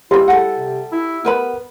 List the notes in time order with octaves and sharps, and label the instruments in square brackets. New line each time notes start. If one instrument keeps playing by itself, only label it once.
[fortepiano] G3 [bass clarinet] E4 [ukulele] F4 B5
[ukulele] A4 F#5
[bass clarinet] C3
E4
[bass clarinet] B3 [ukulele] A#4 B4 B5